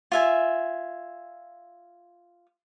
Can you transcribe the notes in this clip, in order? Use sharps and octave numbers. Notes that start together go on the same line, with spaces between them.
F4 E5 G#5